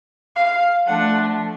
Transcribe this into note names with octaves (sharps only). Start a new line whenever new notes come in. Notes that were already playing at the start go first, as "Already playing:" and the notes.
F5
F3 A3 D4 F#5